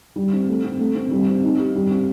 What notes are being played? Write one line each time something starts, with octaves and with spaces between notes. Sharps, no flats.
G3
C4
A3
C4
A3
C4
G3
C4
D#4
G4
G3
C4